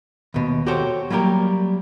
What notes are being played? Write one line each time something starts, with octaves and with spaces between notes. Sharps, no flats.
D#2 B2
F#4 G4 A4 C5 C#5
F#3 G3 A#3 G4 A#4